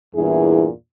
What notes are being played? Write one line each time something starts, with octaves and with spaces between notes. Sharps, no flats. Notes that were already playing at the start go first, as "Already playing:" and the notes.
E2 G2 A#2 E3 E4 G#4